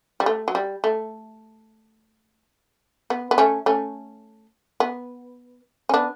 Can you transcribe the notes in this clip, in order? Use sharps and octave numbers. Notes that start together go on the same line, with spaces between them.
G3
A3
F#3
G3
A3
B3
B3
A3 C#4
A3 C#4
B3
C#4
B3 D4